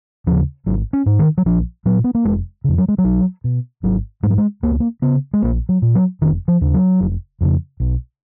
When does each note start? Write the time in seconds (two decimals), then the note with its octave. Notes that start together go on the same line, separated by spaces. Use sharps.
0.27 D#2 C#3 F3
0.66 G#1 F#3
0.93 C#4
1.06 G#2
1.19 D#3
1.38 F#3
1.46 A#1 F3
1.86 A#2 F#3
2.04 B3
2.15 A#3
2.25 F1 G#3
2.64 F2 C#3
2.78 F#3
2.88 G#3
2.98 F#3
3.04 B1
3.44 B2
3.83 G#1 F#3
4.23 G#2 G#3
4.30 F#3
4.38 G#3
4.63 C#2 A#3
4.72 B3
4.80 A#3
5.02 C#3 B3
5.33 G#3
5.42 A#1 A#3
5.69 F#3
5.82 A#2
5.95 F#3
6.21 F1 D#3
6.48 F3
6.61 D#2 C#3
6.74 F#3
7.00 F1
7.41 F2 C#3
7.80 B1